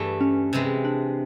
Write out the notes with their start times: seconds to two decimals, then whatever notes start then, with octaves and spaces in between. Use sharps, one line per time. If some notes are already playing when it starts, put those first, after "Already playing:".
Already playing: G2 E3 A3
0.21 C#4
0.53 C3 E3 G#3
0.85 D4